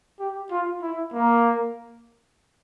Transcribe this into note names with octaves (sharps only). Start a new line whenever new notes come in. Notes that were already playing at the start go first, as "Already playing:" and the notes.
G4
F4
E4
A#3